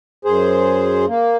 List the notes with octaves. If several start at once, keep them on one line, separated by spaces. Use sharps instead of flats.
F#2 G#4 C5
A#3